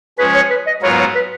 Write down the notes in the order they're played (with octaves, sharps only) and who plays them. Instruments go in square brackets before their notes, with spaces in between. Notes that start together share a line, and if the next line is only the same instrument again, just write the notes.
[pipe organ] F3 G#3 C#4 G#4 [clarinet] B4
[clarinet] C#5
B4
D#5
[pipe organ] G#2 F#3 B3 F4 A#4 [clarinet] C#5
[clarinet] C#5
B4